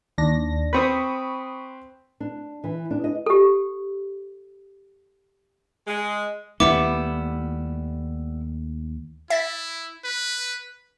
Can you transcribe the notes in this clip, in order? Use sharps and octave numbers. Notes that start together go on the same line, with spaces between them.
D#2 D4 A#6
C4 B4 B5 C#6 D#6
D4
E3
D4
D#5
G4 A4
G#3
D#2 G3 A3 B3 E4 D6
E4 E5 A6 B6
B4